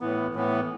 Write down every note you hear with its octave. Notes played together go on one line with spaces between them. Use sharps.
A2 E3 B3
A2 E3 B3